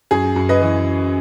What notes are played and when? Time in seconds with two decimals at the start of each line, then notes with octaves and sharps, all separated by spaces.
0.11 F#2 G#4
0.36 F#2
0.49 B4 D#5
0.62 E3